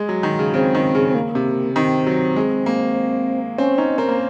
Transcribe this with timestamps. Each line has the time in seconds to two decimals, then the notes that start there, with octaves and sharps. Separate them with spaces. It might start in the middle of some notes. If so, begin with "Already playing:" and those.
Already playing: G#3
0.09 F#3
0.23 D#3
0.39 C#3
0.54 C#3 C4
0.74 D#3
0.95 C#3
1.09 C4
1.15 A#3
1.35 C3
1.75 D#3 C4
2.06 F#3
2.36 G#3
2.66 A#3
3.58 C4 C#4
3.78 C#4 D#4
3.98 C4 A#4
4.09 A#3